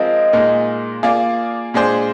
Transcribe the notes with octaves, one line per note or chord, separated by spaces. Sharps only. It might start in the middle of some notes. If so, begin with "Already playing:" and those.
Already playing: F3 G#3 C4 F4 A#4 D#5
A#2 G#3 D#4 A#4
A#3 F4 G#4 D5
A#2 G#3 D4 G#4 C5